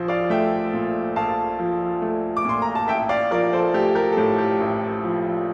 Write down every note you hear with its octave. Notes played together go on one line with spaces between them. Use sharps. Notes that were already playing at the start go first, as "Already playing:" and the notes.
Already playing: A#1 F3 C5
D5 F5
A3 E5 G5
A#2
A#1 F5 A5
F3
A3
D6
A#2 C6
A#5
A5
A1 E5 G5
D5 F5
F3 A#4 D5
A4 C5
A3 G4
G4 A#4
A4
A2 G4
G4
A1
F3